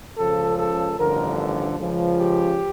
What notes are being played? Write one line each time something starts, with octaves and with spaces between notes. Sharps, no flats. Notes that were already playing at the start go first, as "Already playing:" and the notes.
C#2 C#3 F3 A4
A4
A1 G2 D3 F3 A#4
C#2 C#3 F3
G4